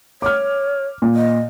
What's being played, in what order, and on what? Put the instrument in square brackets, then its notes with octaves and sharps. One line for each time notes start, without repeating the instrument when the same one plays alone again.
[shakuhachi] C#5 [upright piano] D6 F6
[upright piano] A#2
[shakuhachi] D#5